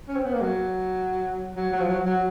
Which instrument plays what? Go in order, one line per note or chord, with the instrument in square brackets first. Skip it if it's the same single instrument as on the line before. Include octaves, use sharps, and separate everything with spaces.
[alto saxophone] C#4
C4
B3
A#3
F#3
F#3
F#3
F3
F#3
F#3